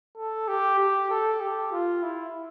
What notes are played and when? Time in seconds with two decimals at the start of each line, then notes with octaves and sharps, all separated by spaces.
0.17 A4
0.48 G4
0.79 G4
1.10 A4
1.41 G4
1.72 F4
2.03 E4